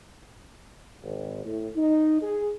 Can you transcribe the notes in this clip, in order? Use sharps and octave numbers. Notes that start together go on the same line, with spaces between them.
G#1
A2
D#4
G#4